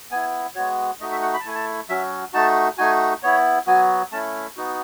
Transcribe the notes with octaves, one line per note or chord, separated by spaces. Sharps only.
B3 E4 G#5
G#3 B3 F#4 C#5
A3 D#4 F#4 D#5
E5
F#5
B5
A5
A3 E4 G#5
A5
F#3 C#4 F#4 E5
A3 D#4 F#4 A5
A3 D#4 F#4 G#5
B3 E4 C#5
F#3 B3 F#4 G#5
A3 C#4 E4 A5
B3 D#4 F#4